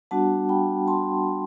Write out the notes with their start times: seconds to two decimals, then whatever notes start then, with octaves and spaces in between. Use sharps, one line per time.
0.11 G3 B3 D4 F#4 F#5 A5
0.49 G5 B5
0.88 A5 C6